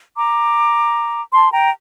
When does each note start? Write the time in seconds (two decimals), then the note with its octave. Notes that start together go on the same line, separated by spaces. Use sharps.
0.16 A#5 D6
1.32 A5 C6
1.52 G5 A#5